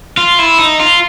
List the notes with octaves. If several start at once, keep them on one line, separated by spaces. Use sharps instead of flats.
F4
E4
D#4
F4